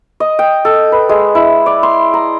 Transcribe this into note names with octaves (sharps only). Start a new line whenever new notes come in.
D#5
G5
A4
B4
G#3
E4
D5
C6
A#5